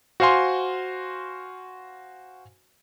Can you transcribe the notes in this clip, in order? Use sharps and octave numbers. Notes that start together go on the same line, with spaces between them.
F#4 C5 F5 G#5 C6